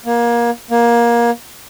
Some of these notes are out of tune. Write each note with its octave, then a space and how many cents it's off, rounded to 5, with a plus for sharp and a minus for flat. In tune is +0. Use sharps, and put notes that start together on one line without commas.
A#3 +25
A#3 +20